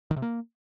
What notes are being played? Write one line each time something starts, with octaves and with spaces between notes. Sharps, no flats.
D#3
C3
A#3